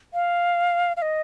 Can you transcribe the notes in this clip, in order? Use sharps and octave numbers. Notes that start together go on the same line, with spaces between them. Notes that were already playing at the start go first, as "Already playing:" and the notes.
F5
F5
D#5